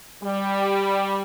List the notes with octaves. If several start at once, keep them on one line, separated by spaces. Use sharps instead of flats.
G3